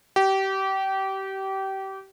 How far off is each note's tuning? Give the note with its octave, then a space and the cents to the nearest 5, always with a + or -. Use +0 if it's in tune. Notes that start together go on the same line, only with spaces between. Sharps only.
G4 -25